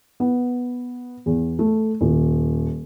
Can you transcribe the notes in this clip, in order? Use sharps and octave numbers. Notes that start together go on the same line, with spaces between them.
B3
E2
A3
D#1